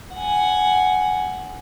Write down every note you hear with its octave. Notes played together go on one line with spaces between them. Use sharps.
F#5 G#5